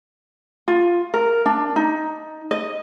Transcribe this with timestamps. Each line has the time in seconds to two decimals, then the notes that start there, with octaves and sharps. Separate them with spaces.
0.68 F4
1.14 A#4
1.46 D4
1.76 D#4
2.51 D#5